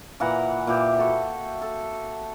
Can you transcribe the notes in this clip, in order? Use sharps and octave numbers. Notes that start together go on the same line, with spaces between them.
A#2 E3 F#5 A#5
A#2 E3 G4
F#4 A4 G5
A4